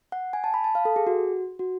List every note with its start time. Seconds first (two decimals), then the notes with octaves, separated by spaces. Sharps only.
0.12 F#5
0.33 G#5
0.44 A5
0.54 B5
0.64 A5
0.75 F5
0.85 A4
0.96 G#4
1.07 F#4
1.59 F#4